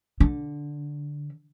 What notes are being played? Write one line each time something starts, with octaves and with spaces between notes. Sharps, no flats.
D3